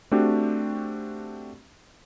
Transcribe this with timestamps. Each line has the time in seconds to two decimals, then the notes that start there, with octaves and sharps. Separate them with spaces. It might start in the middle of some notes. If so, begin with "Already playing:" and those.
0.11 A3 C4 D4 F#4 G4